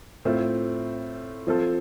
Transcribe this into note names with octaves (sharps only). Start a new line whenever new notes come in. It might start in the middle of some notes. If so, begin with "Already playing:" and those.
A2 A3 C4 F4
F3 C4 F4 A4